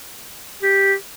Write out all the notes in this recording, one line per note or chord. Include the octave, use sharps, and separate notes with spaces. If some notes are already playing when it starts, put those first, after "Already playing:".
G4